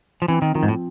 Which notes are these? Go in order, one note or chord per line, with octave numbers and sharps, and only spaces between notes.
F3
E3 C4
D#3
D#3 F3
G#2
A2